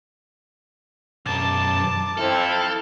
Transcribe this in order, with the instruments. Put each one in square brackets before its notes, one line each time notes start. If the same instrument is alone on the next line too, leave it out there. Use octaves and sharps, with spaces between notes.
[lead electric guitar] B1 F#2 [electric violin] A5 D6
[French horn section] F2 C4 E4 [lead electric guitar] A4 [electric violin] F6